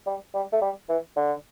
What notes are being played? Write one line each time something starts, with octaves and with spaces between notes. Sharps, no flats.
G3
G3
A3
G3
E3
D3